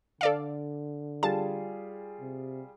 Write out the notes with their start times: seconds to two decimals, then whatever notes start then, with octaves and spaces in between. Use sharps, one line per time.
0.21 D3 A4 D5 F5
1.23 G3 F4 G#4 A5
2.21 C3